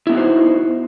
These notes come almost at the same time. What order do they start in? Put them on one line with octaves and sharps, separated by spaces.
E4 B3 D#4 F#4 C5